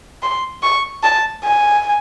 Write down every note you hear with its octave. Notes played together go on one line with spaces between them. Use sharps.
C6
C#6
A5
G#5